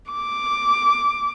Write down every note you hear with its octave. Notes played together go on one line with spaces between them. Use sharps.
D6